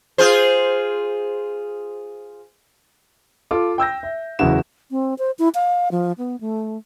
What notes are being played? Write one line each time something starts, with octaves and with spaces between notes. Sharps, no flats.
F4 G#4 C5
F4 A4 D6
G5 E6 G6 A#6
E5
F#1 E2 C#3 E4 F#4 E7
C4
C5
E4
F5
F3
B3
A3